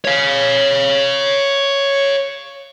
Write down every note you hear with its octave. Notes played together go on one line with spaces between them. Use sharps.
C#5 F5